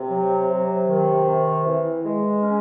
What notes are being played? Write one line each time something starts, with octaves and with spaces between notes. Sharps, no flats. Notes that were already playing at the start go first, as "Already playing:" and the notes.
Already playing: C3
F#3
C3
D#3
C3
E3
G#3
C#4